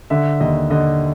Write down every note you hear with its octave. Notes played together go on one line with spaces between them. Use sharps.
D3 E5
D#2 D#5
D3 D#5